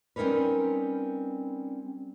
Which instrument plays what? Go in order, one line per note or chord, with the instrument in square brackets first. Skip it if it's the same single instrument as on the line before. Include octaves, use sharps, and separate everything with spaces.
[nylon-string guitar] G3 C4 C#4 D#4 A#4 B4